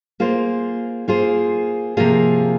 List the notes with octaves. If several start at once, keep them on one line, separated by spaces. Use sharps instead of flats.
A#3 F4 G#4 C5
A#3 F4 G#4 C5
C3 F3 A#3 F4 G#4